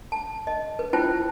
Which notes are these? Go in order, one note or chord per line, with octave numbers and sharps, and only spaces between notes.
A5
D#5
B4
E4 F4 B4 C5 G5 A5